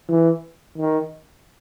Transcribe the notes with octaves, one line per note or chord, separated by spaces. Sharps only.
E3
D#3